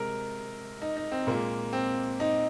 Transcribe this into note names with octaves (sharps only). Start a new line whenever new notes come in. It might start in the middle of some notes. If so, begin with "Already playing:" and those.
Already playing: C3 G#3 A#4
D#4
D#4
C4
A#2 G#3 A#3
C4
D#4